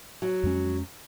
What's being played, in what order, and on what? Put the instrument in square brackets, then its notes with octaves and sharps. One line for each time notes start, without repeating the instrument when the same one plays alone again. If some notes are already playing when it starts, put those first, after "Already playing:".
[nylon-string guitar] F#3
[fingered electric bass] F2 G#3 C#4